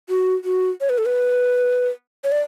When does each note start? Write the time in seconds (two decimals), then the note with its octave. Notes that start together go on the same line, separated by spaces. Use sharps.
0.09 F#4
0.44 F#4
0.81 C#5
0.89 B4
0.98 A4
1.06 B4
2.24 C#5
2.32 D5